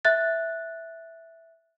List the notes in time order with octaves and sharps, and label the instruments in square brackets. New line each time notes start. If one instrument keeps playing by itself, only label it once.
[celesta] E5 F#6 A6